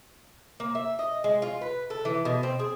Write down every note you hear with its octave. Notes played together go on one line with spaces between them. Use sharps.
A#3
E5
D#5
G#3
F4
B4
A4
E3
B2
C4
G#4